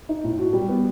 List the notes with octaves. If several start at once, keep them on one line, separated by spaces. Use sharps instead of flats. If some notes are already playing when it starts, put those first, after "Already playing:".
D#4
A2
F#4
G3
B3